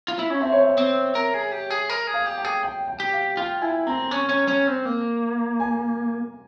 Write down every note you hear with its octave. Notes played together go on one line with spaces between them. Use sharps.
F4
E4
C#4
C4 E5
C#5
E5
C4
A#4
G#4
G4
G#4
A#4
G#4
F5
G4
G5
G#4
G5
G5
G4
F5
F4 G5
E4 G#5
C4 A#5
C#4
C#4
C#4
C4
A#3
G#5